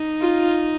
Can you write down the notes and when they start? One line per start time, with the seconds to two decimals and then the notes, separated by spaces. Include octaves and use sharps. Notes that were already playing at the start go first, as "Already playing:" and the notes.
Already playing: D#4
0.21 F4